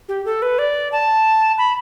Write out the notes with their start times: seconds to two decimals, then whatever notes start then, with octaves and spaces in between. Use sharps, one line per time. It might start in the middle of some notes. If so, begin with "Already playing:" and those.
0.09 G4
0.25 A4
0.42 B4
0.59 D5
0.92 A5
1.58 B5